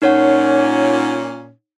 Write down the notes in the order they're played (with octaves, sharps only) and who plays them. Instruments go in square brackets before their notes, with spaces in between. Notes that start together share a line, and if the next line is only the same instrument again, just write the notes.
[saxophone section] A#2 C#4 [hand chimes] D#4 C#5 F#5